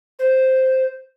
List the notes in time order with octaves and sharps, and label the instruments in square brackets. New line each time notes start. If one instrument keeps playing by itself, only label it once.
[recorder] C5